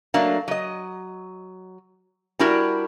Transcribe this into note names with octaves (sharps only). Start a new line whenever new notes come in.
F#3 A3 A#3 D4
F#3 D#5
G3 D4 E4 F#4 A#4